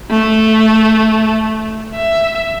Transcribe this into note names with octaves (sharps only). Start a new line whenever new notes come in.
A3
E5